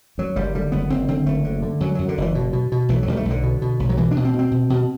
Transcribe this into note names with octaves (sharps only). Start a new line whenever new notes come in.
F#2 F#3
F#1 G3
D3 G3
F#1 B3
F#1 C4
D3 C4
F#1 A3
D3
D3
F#2 F#3
F#2 F#3
D3
F#1 E3
B2
B2
B2
B1 E3
F#3
B1 G3
A3
B1
D3
B2
B2
B1
F#3
B2 E3
D4
B2
C4
B2
C4
B2
B2